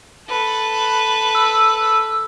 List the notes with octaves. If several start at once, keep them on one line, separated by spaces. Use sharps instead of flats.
A4 B4
E6